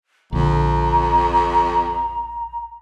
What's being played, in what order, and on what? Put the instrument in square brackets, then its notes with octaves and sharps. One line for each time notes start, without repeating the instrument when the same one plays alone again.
[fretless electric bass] A#1 D3 [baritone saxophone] F2 [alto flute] A#5